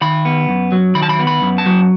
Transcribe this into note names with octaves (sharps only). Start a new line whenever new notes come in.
D#3 B5
B3
F#2
F#3
D#3 B5
A5
B5
B3
B5
F#2
A5
F#3